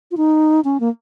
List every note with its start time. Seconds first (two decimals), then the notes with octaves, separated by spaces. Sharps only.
0.11 F4
0.17 D#4
0.64 C#4
0.80 A#3